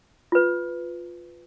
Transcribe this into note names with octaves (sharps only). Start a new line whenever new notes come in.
F4 B4